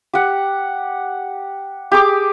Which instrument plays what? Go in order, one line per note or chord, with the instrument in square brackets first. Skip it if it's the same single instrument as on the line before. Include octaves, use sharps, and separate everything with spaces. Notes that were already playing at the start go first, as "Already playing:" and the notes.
[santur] G4 F#5
G4 G#4 D6